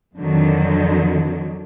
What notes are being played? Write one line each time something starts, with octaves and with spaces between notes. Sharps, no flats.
F2 D3 D#3 F#3